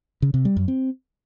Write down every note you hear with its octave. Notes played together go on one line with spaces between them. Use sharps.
C#3
C3
G3
F#2
C4